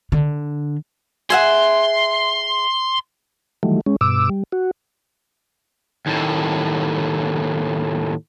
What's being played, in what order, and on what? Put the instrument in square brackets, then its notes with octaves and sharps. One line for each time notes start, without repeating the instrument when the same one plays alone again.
[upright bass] D3
[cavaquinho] G#4 E5 F#5 [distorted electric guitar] C6
[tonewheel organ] D#3 E3 F#3 G3 A3
G#3 C#4
G2 B2 D6 E6
G3
F#4
[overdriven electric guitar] D#2 A2